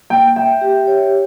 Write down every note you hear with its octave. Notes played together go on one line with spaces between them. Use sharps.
A#3 G5
E5 G5
G4
C#5